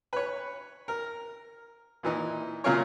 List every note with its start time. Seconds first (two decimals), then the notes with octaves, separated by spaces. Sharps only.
0.13 B4 C#5
0.88 A#4
2.03 A#2 E3 D#4
2.64 A#2 C#3 F#3 F4 A#4 C#5